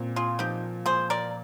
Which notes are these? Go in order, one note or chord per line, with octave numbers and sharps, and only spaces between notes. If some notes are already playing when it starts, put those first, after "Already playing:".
Already playing: A#2 C4
F4 G#4
F3 D#4 G4
A#2 G#4 C5
A#4 D5